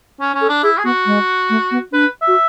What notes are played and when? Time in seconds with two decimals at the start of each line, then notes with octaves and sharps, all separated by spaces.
0.20 C#4
0.34 C#4
0.41 A4
0.48 D4
0.63 E4 G#4
0.78 G#4
0.84 B3 F#4
1.06 G#3
1.50 A3
1.71 B3
1.92 D4 B4
2.22 E5
2.28 F#4